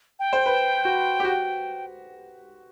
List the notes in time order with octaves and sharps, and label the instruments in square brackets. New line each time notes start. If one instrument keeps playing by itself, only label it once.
[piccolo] G5
[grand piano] C5
B4
F#4
G4
F#4